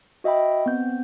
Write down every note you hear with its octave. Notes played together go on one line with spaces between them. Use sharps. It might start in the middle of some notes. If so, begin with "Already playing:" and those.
F#4 D#5 E5 G5 B5
B3 C4 G6